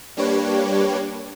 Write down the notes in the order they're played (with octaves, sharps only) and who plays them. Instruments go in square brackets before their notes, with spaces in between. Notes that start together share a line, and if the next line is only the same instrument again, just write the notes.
[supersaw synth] G3 A#3 D4 G4 B4 C#5